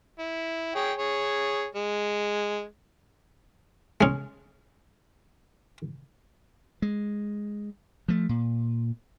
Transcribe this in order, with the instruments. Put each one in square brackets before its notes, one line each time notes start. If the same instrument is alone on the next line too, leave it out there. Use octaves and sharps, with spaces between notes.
[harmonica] E4
G#4 C#5 G5
G#4 C#5
G#3
[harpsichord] G#3 C#4
[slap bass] G#3
F3 A3
A#2